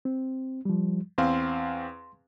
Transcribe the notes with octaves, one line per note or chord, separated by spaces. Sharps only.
C4
F3 G3
E2 C4 F5 C6